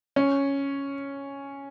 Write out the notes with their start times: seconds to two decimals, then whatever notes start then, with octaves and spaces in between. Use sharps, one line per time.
0.16 C#4